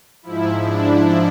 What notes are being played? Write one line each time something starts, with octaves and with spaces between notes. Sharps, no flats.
G#2 F3 E4
D4